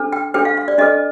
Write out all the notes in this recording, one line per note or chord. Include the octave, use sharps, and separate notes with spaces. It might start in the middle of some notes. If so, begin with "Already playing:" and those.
Already playing: D4 A4 C5
G5
D4 A4 C5 G5
F5
F5
D5
D4 A4 C5 D#5